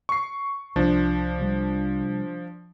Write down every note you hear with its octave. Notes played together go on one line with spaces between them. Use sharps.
C#6 C7
C2 F3 D4
C3 G3